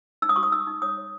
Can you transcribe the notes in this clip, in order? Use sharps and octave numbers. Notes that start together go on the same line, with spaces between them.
D#4 E6
D#6
F#4 C#6
D#6
D#4 E6
D#4
C#5 D#6
C#5